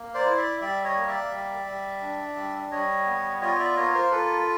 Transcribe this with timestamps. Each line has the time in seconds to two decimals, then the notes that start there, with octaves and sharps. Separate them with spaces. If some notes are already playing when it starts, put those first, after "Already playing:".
Already playing: A#3
0.14 C5 D5
0.26 E4
0.38 D5 E5
0.61 G3 D5 E5
0.84 C#5 D#5
0.96 A#3
1.07 D5 E5
1.31 G3
1.66 G3
2.01 D4
2.36 G3
2.71 G3 C#5 D#5
3.06 B3
3.41 F4 C#5 D#5
3.58 D5 E5
3.76 A#3 C#5 D#5
3.94 A#4 C5
4.11 F4 A4 B4